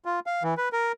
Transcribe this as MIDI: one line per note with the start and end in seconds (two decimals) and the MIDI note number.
0.05 0.20 65
0.26 0.43 77
0.43 0.54 52
0.57 0.69 71
0.73 0.92 70